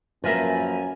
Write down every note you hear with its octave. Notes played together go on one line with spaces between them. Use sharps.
F#2 F3 A#3 A#4 B4 E5 G#5